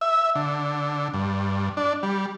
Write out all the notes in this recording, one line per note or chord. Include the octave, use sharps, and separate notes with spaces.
E5
D3
G2
D4
G3